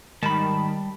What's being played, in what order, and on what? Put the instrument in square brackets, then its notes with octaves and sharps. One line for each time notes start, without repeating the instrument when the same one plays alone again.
[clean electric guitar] G#2 B5 [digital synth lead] D#3 [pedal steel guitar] G3 A5